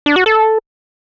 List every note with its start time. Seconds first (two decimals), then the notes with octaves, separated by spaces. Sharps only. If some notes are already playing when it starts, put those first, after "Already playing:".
0.06 D4
0.16 F#4
0.26 A4